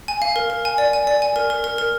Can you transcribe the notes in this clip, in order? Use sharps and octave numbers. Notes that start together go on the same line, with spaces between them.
G#5
F5
A#4
A#4
G#5
D5
G#5
D5
G#5
A#4
A#4
A#4
A#4